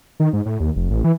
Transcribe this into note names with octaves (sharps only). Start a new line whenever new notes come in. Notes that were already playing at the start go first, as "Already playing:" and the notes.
D#3
G#2
A2
D#2
F1
A1
E3